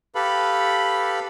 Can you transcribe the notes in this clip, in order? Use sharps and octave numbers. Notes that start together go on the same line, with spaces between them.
G4 A4 B4 F5 B5